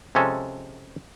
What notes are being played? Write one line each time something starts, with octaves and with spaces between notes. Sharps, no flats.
C3 F3 G#3 C#4 A4